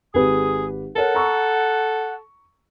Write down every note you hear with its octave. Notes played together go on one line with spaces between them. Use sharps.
G#1 G4 G#4 B4 D#6
A4 A#4 C#5 F#5
A#5 C#6 E6